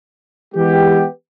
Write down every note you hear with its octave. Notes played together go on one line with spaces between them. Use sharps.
E3 G#3 B3 G4